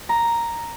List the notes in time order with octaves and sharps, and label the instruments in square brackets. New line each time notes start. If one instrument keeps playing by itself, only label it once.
[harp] A#5